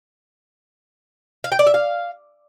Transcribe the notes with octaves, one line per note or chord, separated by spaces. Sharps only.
F5
G5
D5
E5
F5